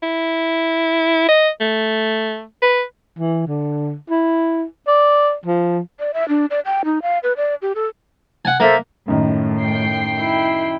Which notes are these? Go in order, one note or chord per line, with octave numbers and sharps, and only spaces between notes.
E4
D#5
A3
B4
E3
D3
E4
D5
F3
D5
E5
D4
D5
G5
D#4
F5
B4
D5
G4
A4
F#5 G#5
A#3 A4 C5 E5
F#2 A2 D#3
G5 C7
E4